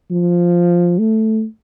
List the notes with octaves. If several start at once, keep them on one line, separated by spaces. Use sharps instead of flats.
F3
A3